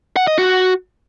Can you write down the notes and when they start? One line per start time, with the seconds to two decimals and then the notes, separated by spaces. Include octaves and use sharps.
0.16 F#5
0.27 D#5
0.38 F#4